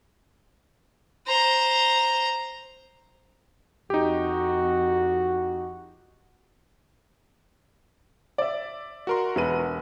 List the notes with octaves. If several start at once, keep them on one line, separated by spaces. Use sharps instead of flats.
C5 A#5
F2 D#4 F#4 G4
D5 E5
F#4 A#4 C6
E1 B4 D#7